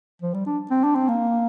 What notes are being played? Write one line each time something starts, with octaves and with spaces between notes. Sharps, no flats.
F3
G3
D4
C4
D4
C4
A#3